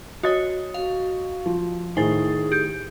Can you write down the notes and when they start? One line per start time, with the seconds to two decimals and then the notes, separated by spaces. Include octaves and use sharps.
0.23 F#4 C#5 D#5 D#6 A6
0.74 F#4 F5
1.46 F3
1.97 A2 D#3 G#4 C5 G#5 A6
2.52 G4 G6